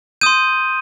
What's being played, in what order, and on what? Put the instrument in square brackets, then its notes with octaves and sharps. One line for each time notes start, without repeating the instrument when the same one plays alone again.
[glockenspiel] C6 D#6 G6 D#7